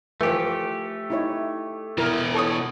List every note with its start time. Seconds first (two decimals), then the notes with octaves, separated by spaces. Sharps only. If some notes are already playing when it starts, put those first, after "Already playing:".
0.21 E3 F3 A3 G4
1.10 D#4 E4 C#5
1.98 B2 E3 E4 A#4
2.34 A4 C#5 D#6